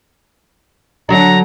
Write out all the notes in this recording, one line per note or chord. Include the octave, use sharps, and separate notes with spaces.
D3 F#3 D4 A#5